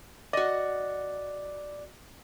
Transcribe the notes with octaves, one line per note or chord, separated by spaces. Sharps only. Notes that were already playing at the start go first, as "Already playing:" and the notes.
F#4 D5 D#5